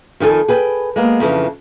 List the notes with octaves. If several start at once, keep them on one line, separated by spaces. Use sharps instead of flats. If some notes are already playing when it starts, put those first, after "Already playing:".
F2 D#3 G#4 A4 G#5
G#4 B4 G5
G#3 A#3 B3
F2 C#3 E3 D4